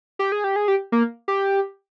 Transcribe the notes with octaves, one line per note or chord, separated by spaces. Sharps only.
G4
G#4
G4
G#4
G4
A#3
G4